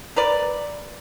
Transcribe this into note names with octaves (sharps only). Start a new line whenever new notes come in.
A#4 B4 D5